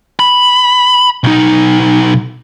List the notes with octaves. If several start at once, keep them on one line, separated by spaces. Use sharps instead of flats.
B5
B1 D#4